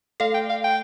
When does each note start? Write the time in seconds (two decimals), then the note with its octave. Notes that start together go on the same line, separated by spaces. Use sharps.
0.20 A3 A4 F5
0.34 G5
0.50 F5
0.64 G5